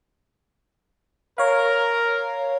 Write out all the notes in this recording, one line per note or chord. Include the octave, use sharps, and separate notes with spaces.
A#4 C#5 F5